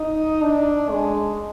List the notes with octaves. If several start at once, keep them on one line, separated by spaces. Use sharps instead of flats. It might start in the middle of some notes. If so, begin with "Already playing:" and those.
Already playing: D#4
D4
G#3